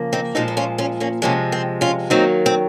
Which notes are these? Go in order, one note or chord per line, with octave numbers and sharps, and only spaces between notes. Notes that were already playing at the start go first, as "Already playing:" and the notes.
Already playing: C#3 F3 A#3
C4 D#4
A#2 F3 G#3 C4 D#4
D#4
C#4 F4
C#4 F4
A#3 C#4
C3 F3 G#3 A#3 C#4
C4
C#4 F4
D#3 F#3 A#3 C4 D#4
C4